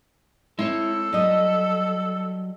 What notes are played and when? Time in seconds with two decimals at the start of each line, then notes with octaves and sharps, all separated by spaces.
0.59 G#3 C4 E4 A4 C#5
1.13 F#3 G3 D#5